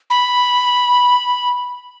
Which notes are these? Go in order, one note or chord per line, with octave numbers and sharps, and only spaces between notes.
B5